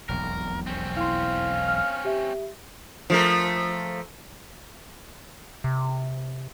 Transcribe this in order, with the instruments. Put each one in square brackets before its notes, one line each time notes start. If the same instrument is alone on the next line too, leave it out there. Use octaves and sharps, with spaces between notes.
[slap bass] E1 B1 F2 [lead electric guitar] A#4
[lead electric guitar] C4 C#4
[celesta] E4 C6 [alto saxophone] F5
[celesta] F6
G4 E5
[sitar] F3 A3 A#4
[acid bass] C3